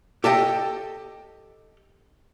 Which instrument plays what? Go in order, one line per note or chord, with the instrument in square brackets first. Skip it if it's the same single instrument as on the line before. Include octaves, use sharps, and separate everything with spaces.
[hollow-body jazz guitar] G4 A4 D#5 G5